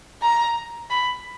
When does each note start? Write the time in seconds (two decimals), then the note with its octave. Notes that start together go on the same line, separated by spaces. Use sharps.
0.22 A#5
0.90 B5